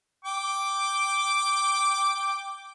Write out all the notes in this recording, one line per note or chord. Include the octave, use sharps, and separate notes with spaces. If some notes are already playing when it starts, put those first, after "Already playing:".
G5 D6